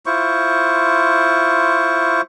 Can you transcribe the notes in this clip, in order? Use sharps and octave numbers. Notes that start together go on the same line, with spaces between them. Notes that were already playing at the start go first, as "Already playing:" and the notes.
E4 F4 C5 C#6